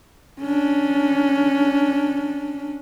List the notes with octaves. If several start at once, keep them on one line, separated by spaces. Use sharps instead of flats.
C#4 D4